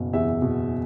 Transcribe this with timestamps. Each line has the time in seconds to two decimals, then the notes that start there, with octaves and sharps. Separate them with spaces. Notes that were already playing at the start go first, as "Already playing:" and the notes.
Already playing: F#1 B2
0.13 E2 E5
0.42 B2